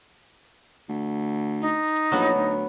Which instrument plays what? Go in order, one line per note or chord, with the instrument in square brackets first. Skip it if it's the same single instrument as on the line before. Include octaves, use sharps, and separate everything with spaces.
[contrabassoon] D2
[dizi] D#4
[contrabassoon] A#1 [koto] F#3 B3 B4
[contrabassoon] D2